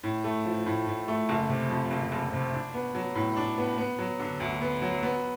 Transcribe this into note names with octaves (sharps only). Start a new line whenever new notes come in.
A2
A3
F3
A2
A2
A3
F#1
C3
F2
F#1
F#1
C3
D4
B3
F#3
A2
D4
B3
B3
F#3
D3
D2
B3
F#3
B3